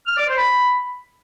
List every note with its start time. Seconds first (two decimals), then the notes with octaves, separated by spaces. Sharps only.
0.07 F6
0.17 D5
0.28 C5
0.38 B5